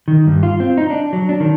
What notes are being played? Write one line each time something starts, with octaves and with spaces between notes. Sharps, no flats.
D#3
G2
F4
C4
D#4
D4
F#3
D4
D#3